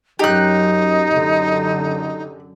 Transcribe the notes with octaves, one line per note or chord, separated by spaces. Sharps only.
F#2 D#4 G4 F#6
F#2 D3